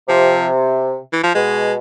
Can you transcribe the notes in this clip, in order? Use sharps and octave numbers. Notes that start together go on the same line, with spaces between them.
C3 F3
E3
F3
B2 G#3